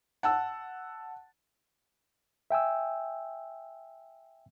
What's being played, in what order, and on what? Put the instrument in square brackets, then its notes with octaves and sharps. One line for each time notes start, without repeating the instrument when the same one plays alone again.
[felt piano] F#5 A5 E6
[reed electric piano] E5 G5 G#5 E6